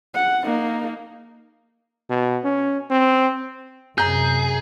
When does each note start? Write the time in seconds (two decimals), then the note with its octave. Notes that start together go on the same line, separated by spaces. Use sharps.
0.15 F#5
0.44 A#3 D#4
2.10 B2
2.44 C#4
2.91 C4
3.98 F#2 C3 G#4 A#5 G6